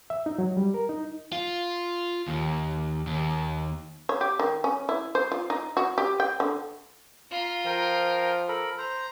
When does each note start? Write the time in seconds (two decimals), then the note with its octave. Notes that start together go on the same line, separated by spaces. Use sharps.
0.10 E5
0.26 D#4
0.38 F#3
0.57 G3
0.74 A#4
0.89 D#4
1.33 F4
2.28 D#2
3.07 D#2
4.09 C#5
4.21 G4
4.39 D#3
4.64 C#4
4.89 E4
5.15 C5
5.32 F4
5.50 D#4
5.77 F#4
5.98 G4
6.20 G5
6.40 D3
7.31 F4 A#5
7.66 F3 A#4 G5
8.49 A4 A#4 B5
8.78 C5 A#5